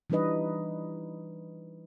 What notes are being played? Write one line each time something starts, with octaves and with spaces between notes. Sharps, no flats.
E3 G3 D4 D#4 B4 D#5